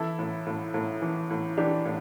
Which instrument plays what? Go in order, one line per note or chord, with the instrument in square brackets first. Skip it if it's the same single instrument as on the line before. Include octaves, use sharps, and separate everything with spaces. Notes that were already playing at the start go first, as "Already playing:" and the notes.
Already playing: [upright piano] E3 E4 A4
A2
A2
A2
E3
A2
E3 D4 G4
A2